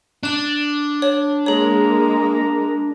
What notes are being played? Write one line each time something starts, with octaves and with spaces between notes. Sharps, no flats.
D4 F#6 E7
C#5
G#3 A#3 G#4 C#5 A#5